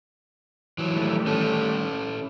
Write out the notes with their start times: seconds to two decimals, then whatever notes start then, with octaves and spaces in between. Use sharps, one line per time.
0.78 E3 F#3
0.96 D#3 G3 A3
1.26 C#4 A4